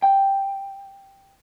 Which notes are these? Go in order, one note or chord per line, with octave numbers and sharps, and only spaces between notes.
G5